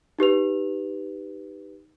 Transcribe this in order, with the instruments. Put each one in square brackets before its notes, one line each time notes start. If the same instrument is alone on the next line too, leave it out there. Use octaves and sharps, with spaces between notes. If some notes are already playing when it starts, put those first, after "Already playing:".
[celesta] D#4 G4 B4 F7